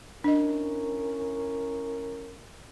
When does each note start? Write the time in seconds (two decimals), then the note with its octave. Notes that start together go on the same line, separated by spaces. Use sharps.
0.24 C#4 D4 E4 A#4 D#5